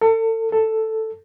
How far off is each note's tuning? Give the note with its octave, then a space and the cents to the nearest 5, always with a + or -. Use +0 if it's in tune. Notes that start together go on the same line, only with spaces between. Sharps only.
A4 +35
A4 +5